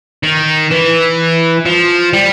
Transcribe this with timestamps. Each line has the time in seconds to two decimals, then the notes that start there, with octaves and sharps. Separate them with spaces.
0.23 D#3
0.70 E3
1.66 F3
2.13 G3